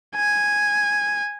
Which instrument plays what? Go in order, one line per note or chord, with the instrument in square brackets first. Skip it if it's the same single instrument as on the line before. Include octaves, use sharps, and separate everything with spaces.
[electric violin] G#5